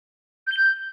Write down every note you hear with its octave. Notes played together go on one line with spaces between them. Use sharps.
G6
G7
G6